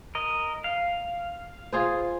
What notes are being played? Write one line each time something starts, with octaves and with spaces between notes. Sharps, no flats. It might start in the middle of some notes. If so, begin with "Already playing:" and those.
A#4 D#5
F5
F4 G#4 C5